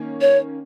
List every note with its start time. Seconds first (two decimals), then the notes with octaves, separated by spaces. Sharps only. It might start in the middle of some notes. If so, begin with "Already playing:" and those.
Already playing: D#3 A#3 C#4
0.21 C#5